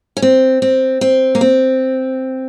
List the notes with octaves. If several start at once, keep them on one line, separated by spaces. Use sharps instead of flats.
C#4
C4
C4
C4
A#3
C4